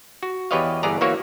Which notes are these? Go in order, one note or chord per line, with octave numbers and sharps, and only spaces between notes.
F#4
E2 G4 B4 C#5 D#5 F5
G1 E3 B3 G#4 D5 A#5
E3 A#3 F#4 C#5